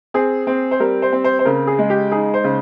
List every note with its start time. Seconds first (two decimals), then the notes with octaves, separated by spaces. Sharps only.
0.14 C4 G#4
0.47 C4
0.71 C5
0.80 G3 A#4
1.02 C5
1.13 C4
1.24 C5
1.39 C5
1.45 C#3 A#4
1.67 G#4
1.79 G#3
1.90 G4
2.12 D#4 G#4
2.34 C5
2.44 C#3